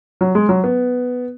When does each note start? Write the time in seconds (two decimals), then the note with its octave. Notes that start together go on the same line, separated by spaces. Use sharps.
0.21 F#3
0.35 G#3
0.49 F#3
0.64 B3